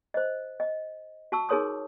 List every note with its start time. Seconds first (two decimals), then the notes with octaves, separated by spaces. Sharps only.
0.14 C5 D#5
0.60 D#5
1.32 F#4 A5 C#6 E6
1.49 D#4 G#4 A#4 C#5 C6 D#6